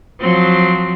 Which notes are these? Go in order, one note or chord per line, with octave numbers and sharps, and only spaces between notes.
F3 F#3 C4